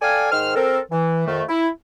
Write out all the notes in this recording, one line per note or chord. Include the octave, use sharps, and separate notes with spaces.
A4 D5 F5 G5 G#5
G#2 D#3 C5 G5 F6
C4 A4 A#4
E3
F2 D#3 A3
E4